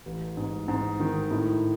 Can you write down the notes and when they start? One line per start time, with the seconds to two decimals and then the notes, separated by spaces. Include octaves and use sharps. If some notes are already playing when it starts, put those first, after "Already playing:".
0.06 A1
0.37 G#2
0.68 G#2
1.00 D#3
1.31 A2